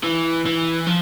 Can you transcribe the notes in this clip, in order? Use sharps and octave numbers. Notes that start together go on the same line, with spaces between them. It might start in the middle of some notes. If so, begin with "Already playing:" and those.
E3
E3
F3